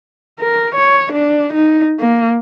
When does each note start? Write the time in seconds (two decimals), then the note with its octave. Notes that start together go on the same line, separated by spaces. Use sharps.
0.40 A#4
0.75 C#5
1.13 D4
1.53 D#4
2.00 A#3